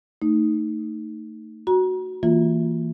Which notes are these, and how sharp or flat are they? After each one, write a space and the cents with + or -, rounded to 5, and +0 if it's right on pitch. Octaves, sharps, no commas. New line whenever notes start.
A3 +25 D#4 +0
F#4 +0 A#5 +35
E3 +0 A#3 -15 F4 +0